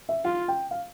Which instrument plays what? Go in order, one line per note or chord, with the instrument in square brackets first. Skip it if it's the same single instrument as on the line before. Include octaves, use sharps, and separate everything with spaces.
[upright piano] E5
[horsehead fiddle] F4 [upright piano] F5
[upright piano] G5
F5